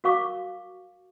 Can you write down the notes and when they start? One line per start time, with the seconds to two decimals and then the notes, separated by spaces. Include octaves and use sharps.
0.04 F#4 A#4 F5 C#6 D6